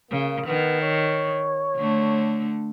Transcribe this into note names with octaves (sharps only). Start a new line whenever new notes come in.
C#3 A#3
D#3 B3
C#5
D3 A3